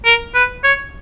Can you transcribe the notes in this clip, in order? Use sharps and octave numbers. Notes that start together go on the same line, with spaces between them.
A#4
B4
C#5